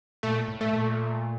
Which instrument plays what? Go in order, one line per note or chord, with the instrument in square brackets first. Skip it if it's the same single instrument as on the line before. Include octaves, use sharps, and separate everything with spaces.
[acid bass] A#2 [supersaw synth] A3
[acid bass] A2
[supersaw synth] A3
[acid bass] A#2